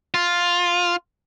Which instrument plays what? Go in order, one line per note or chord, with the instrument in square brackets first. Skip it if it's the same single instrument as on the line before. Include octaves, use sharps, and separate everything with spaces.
[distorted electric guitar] F4